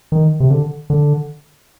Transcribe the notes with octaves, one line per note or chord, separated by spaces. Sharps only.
D#3
C3
D3
D3